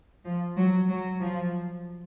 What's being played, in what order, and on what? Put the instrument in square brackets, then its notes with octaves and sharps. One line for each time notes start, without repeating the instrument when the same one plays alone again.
[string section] F3
F#3
F#3
F3